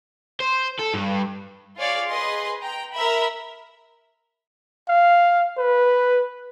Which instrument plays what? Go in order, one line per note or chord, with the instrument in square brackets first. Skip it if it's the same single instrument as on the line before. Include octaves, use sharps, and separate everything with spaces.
[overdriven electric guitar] C5
A4
G2
[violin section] F4 G#4 C#5 D5 F5
G#4 B4 D#5 C6
G5 A#5
A#4 E5 B5
[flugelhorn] F5
B4